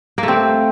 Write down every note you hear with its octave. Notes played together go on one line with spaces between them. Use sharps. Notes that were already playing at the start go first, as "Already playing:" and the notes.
A#3
A3
C4